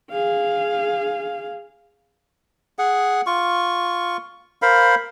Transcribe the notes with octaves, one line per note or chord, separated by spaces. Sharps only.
G#4 F5
G#4 F#5
F4 C#6
A#4 C5 F5 B5